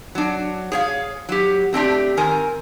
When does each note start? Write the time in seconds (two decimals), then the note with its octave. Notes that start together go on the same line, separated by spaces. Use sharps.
0.15 F#3 D4
0.72 G#4 C#5 F5
1.29 F#3 G4
1.73 A3 C4 D4 G4
2.17 D#3 C4 A#4 G#5